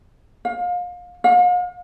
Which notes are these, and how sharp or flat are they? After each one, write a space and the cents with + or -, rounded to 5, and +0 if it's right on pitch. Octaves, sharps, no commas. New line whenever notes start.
F5 +30
F5 +45